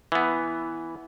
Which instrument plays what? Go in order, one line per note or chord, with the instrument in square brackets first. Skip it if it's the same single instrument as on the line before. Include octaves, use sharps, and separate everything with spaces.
[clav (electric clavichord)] E3 B3